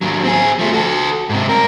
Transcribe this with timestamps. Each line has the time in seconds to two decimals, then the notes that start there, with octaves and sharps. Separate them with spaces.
0.01 D#2 F#3
0.24 C4 G#4
0.59 F3 A3
0.73 F#4 A4
1.29 G#2 C3
1.49 G2 A#4